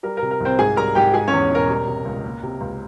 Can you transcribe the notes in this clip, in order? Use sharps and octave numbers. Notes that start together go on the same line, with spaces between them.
G3 A#4
A#4
C3
A#4
C2 C4 C5
G#2 G#4 G#5
G3 A#4 A#5
G#2 G4 G5
G#3 G#4 G#5
C#4 C#5
E2
E1 A#4
G3
C3
C#2
A#3
C3
C#2